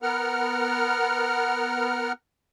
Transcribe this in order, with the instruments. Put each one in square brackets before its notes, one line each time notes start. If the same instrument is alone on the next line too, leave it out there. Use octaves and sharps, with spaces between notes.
[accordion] B3 A#4 F#5 F6